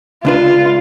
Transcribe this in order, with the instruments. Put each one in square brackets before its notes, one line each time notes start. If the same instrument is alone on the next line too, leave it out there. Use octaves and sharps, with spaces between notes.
[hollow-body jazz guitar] C#2 D4 B4 [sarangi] F4